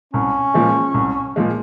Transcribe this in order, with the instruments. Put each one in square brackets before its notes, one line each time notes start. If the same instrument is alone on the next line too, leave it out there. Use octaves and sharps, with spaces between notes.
[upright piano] C2 [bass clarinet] C#4
[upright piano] A#2 F3 G#3
C2
A#2 F3 G#3